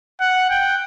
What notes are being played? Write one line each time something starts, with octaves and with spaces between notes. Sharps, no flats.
F#5
G5